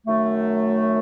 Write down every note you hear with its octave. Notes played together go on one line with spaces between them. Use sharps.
F#2 D#3 F#3 A3